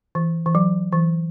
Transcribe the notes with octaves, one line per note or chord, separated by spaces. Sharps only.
E3
E3
F#3
E3